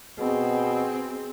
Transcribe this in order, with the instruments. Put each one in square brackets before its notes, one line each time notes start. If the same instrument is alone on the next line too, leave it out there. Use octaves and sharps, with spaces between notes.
[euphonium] B2 [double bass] C4 [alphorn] G#4